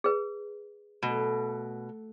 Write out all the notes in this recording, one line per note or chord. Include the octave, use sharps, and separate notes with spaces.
G#4 B4
B2 A3